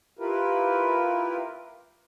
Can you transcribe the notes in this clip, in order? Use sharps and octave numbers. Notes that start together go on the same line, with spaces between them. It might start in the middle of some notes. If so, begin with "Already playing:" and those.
E4 F4 G4 A#4 B4